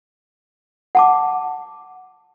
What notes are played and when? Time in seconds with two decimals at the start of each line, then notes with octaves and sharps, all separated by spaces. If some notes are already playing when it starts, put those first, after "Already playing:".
0.95 F#5 A5 D6